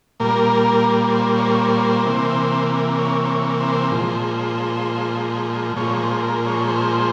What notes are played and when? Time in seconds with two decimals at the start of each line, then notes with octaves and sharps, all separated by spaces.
0.20 A#2 G3 A#3 A#4
1.12 C5
1.35 C#5
1.43 C5
1.51 C#5
1.59 C5
1.76 C#5
1.83 C5
2.06 C3 E3 A#3
2.98 C#5
3.24 C5
3.29 C#5
3.60 C5
3.91 A#2 F3 G#3
5.76 A#2 F3 G#3 C#5
6.00 C5
6.23 A#4
6.46 C#5
6.68 C5